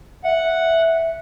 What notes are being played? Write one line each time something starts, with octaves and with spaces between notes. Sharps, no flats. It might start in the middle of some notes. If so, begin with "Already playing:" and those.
E5 F#5